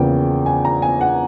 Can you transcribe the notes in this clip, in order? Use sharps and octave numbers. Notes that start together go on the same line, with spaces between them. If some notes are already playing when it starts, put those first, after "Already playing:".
Already playing: E2 C#3 F3 A#3 G5
G#5
A#5
G#5
F#5